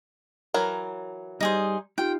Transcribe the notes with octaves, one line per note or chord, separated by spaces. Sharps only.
E3 F#3 A#4
G3 D#4 G#4 C5
D#4 F4 G4 G5